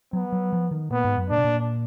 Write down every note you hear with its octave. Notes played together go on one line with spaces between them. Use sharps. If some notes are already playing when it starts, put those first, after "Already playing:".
F#3 B3
F#3
F3
D#3
A#2 B3
G#2
F#2
A#2 D4
B2
A#2